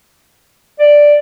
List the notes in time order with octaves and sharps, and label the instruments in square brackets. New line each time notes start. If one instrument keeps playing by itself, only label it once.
[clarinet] D5